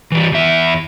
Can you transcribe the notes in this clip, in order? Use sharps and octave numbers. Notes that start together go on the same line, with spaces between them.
E3 G3
E2 E5